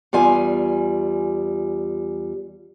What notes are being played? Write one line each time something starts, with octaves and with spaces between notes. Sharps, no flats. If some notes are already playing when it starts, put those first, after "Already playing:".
E2 G3 F4 G#5